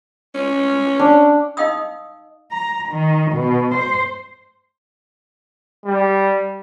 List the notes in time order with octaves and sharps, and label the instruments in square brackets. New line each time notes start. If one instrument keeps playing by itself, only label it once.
[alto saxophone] C#4
[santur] D4
[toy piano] D#4 D#5 F5 G5 D#6 E6
[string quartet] A#5
D#3
B2
C5
[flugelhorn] G3